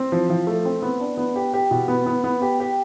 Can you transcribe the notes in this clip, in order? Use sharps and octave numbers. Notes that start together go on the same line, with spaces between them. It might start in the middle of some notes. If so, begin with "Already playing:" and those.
Already playing: C4
F3
F3
A3
C4
B3
D4
B3
G4
G4
B2
B3
B3
B3
G4
G4